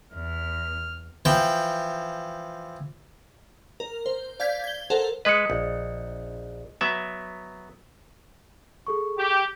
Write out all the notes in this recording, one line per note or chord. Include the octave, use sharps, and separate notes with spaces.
E2 F6
E3 F3 G5
A#4
C5
D5 F5 G6 G#6 B6
G#6 G7
A4 A#4 C5 F#5
G#3 B4 D#5 D#6 C#7
A#1
F#3 B3 E5
G#4 A4 C#6
G4